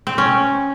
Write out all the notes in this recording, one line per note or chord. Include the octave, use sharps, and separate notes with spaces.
C4
C#4